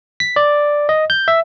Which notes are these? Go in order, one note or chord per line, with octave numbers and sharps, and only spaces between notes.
B6
D5
D#5
G6
E5